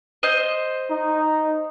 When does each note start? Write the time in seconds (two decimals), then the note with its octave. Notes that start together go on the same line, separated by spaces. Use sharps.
0.23 C5 D#5
0.91 D#4